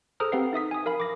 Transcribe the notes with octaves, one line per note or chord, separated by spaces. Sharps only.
G#4 A4 C5 A#5 D#6 F6
C4 G4 B4 F5 F#5 C7
D#4 E5 D#6 B6
G#5 D#6
A#4 F5 B5
D6 A#6